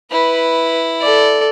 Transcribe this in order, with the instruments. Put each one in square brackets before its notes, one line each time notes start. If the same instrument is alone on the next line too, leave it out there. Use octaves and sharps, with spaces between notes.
[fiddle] E4 [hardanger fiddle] B4
[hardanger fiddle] A4 D5